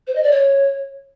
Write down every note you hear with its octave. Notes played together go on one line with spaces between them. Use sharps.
C5
D#5
D5
C#5